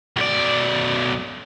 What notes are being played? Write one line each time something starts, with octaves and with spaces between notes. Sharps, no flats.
B1 D5